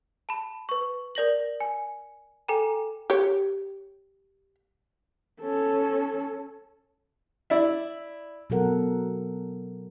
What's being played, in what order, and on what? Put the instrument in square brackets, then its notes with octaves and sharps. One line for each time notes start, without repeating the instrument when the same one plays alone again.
[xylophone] A5 B5
B4 C#6
A#4 D5 A#6 F#7
G#5
A4 G5 G#5 A#5
[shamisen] G4 C#5
[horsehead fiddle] C#4 A4
[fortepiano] E4 D5 E5
[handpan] B2 F#3 C4 A4 A#4 F#5